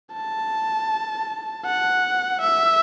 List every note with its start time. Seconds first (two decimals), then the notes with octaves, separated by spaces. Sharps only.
0.14 A5
1.66 F#5
2.41 E5